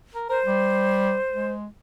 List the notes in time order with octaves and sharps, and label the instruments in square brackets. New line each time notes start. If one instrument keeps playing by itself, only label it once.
[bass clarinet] A#4
[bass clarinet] A#4 [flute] C5
[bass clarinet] G3
G#3